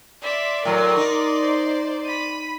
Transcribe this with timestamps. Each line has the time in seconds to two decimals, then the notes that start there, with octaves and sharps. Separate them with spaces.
0.23 D5 E5 C6
0.65 A2 F#3 A#4
0.97 D#4
1.41 C5
2.05 B5 D#7